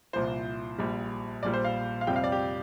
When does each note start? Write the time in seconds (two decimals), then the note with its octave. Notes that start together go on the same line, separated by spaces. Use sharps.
0.13 C2 A#2 F3 C5
0.78 A#1 A#2 G3
1.43 A#1 A#2 G3 D5
1.54 C5
1.64 F5
2.01 F5
2.07 F2 C3 G3 G5
2.16 F5
2.24 D5
2.32 G4